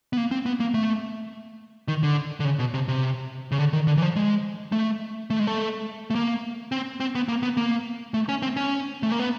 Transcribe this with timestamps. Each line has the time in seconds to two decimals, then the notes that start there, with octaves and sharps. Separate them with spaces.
0.13 B3
0.17 A#3
0.31 C4
0.46 B3
0.60 A#3
0.74 A3
1.88 D#3
2.03 D3
2.40 D3
2.45 C#3
2.59 B2
2.74 C3
2.88 C3
3.52 C#3
3.58 D3
3.73 D#3
3.87 D3
3.97 E3
4.02 F3
4.16 G#3
4.72 A3
5.30 A3
5.39 G#3
5.47 A3
6.10 A3
6.15 A#3
6.72 C4
7.00 C4
7.15 B3
7.28 A#3
7.43 B3
7.57 A#3
8.14 A3
8.29 C#4
8.42 C4
8.57 C#4
9.03 A3
9.12 A#3
9.19 B3